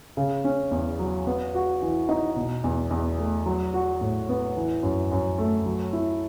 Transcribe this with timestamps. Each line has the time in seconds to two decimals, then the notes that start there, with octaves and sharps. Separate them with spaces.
0.17 C#3
0.44 C#4
0.71 E2
0.99 F#3
1.27 B3
1.55 F#4
1.82 E3
2.09 D#4
2.36 B2
2.64 E2
2.91 E2
3.19 A3
3.46 F#3
3.74 F#4
4.01 A2
4.29 B3
4.57 E3
4.83 F#2
5.12 F#2
5.38 A3
5.66 F#3
5.93 E4